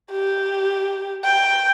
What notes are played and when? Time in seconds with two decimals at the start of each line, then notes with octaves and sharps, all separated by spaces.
0.12 G4
1.24 G5